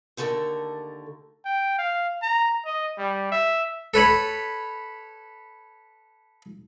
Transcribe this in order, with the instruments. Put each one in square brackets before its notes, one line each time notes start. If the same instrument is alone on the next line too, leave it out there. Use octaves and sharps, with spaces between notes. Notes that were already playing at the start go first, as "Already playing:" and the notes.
[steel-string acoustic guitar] D#2 D3 A3 A4 A#4
[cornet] G5
F5
A#5
D#5
G3
E5
[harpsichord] A4 B4 C#5 B5